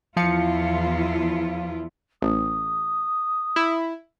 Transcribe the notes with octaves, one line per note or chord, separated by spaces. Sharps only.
E2 F3 E4 F4 F5 C#7
A1 D#6
E4